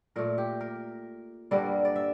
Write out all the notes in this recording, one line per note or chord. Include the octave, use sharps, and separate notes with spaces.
A#2 A3 A#4
G4
A#4
G2 D3 G3 A#3 A#4
D5
E5